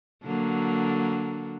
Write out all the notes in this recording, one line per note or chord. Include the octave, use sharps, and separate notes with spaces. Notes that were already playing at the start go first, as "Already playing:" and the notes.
D3 F#3 A#3